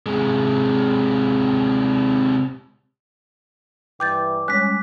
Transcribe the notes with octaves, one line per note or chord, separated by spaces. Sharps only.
C3 G#3
G2 E3 G5 D6 G6 A6
G3 G#3 C#4 F#6 B6